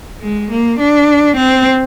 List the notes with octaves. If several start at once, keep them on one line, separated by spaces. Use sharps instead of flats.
G#3
A#3
D4
C4